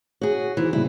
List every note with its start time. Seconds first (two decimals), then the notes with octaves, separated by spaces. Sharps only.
0.21 F#4 G#4 C#5
0.57 E3 D#4 F#4 C5
0.73 A#2 C#3 G3 E4